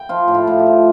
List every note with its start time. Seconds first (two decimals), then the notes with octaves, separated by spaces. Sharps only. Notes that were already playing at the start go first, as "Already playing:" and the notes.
Already playing: G5
0.09 F3 F4
0.28 A2
0.35 F4
0.47 A2
0.59 G4
0.67 F3